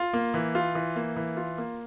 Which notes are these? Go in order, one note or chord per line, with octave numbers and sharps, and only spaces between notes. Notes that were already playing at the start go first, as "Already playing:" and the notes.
Already playing: F4
A#3
E3
F4
E3
A#3
E3
F4
A#3